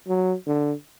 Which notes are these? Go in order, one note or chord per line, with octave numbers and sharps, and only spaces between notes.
F#3
D3